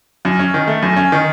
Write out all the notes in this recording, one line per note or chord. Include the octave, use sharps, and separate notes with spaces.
F#2
C#4
D#3
A3
F#2
C#4
D#3